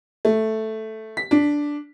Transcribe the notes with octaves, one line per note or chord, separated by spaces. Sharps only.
A3
B6
D4